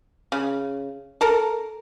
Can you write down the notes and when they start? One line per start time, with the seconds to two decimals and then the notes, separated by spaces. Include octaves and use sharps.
0.32 C#3
1.21 A4 A#4